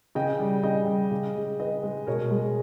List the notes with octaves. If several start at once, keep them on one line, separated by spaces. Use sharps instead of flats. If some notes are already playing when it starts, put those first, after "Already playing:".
C#3 D#5 G5
G3
C#3 D#5 G5
G3
C#3
G#3
C#3 B4 D#5
G#3
B2 A#4 C#5
G#3